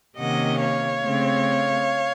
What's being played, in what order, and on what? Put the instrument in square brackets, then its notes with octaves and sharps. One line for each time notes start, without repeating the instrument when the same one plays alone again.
[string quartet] C3 D#3 A#3 C#4 D#5 F#5
C#5 F5
C#3 A3 C4